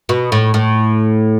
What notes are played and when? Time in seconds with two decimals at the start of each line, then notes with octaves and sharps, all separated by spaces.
0.09 B2
0.32 A2
0.54 A2